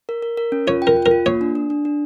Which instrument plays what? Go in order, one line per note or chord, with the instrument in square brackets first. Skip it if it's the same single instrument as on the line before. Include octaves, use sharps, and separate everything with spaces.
[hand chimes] A#4
A#4
A#4
C#4
[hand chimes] F4 [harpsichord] C#5
[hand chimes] G5
[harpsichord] A#4
[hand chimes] F4
[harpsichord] A#4
[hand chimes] F4
[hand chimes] A#3 [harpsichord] C#5
[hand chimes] D4
D4
D4
D4